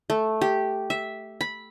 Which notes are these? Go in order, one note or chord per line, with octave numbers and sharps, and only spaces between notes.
A3
G4
E5
B5